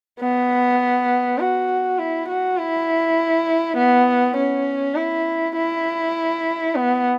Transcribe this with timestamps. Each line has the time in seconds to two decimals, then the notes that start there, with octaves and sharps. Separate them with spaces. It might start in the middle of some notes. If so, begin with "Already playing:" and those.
0.20 B3
1.39 F#4
1.99 E4
2.28 F#4
2.58 E4
3.77 B3
4.37 C#4
4.96 E4
5.56 E4
6.75 B3